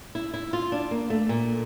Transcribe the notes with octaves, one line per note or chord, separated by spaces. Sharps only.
E4
E4
F4
D4
A#3
A3
A#2